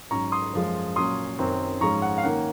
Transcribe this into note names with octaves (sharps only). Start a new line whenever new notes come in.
G#2 F#3 C#4 A#5 C#6
C6 D#6
F#2 F3 G#3
A#2 F#3 C#4 C6 D#6
F#2 D#3 F#3 C4
G#2 F3 G#3 C#4 A#5 C#6
F#5
F5
D#3 A#3 C#4 F#5